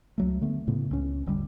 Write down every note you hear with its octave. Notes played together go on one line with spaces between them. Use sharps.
C#2 F#3 A3
D3 A3 B3
A2 C#3 B3
C#2 C#4
E1 A1 D3 G3